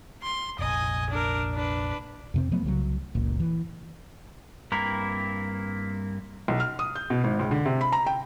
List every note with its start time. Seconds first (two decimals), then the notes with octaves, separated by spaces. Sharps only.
0.23 C6
0.59 F1 A#1 D#5 G#5
1.10 D4 A#4
1.53 D4 B4
2.34 F2 C3 C4
2.51 F3 F#3 A3 B3
2.64 C2 C#3 E3 F#3
3.15 F#1 C#2 A#2
3.40 E3
4.72 G2 A#3 C4 E4 A#5
6.48 B1
6.60 F6
6.79 D#6
6.96 G6
7.10 B2
7.24 G#1
7.39 C#2
7.51 D3
7.66 C3
7.81 B5
7.92 A#5
8.06 G5